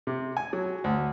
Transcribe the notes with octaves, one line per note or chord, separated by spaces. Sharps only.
C3
G#5
F#3
D2